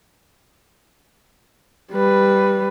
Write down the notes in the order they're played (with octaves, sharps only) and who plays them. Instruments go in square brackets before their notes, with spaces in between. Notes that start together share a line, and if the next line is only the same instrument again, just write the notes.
[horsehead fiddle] G3 B4